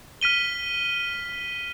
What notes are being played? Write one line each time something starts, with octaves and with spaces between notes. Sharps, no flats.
F6 B6 D#7 G7